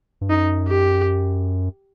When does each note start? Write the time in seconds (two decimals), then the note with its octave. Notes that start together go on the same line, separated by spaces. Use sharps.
0.21 G2
0.30 F#2 D#4
0.68 G4